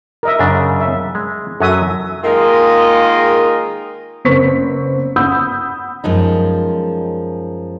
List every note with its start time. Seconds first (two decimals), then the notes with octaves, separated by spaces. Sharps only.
0.23 A#4 D#5 E5
0.39 F#2 C#3 D4
0.80 E5
1.15 G#3
1.61 F#2 F#3 A4 E5 D#6
2.23 D#3 G#3 A#3 F4 D#5
4.25 F#1 B3 C4 A#4 C#6 B6
5.16 F#5 B5 D#6 E6 G6
6.04 F#2 F3 G#3 D#4